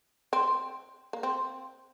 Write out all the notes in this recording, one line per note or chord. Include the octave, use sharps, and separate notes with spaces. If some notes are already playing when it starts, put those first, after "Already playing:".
C4
A#3
C4